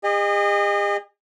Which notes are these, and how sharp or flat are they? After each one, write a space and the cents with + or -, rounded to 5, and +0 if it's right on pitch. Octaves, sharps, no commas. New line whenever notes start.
G#4 -45 D#5 -25